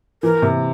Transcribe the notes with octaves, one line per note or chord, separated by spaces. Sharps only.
E3 A#4
C3